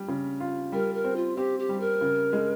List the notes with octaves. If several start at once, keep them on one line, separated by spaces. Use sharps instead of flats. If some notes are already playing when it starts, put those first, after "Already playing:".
Already playing: G3
C#3
F4
G3 A#4
A#4
C4
F4
C4 G4
G4
G3
A#4
C#3
G#3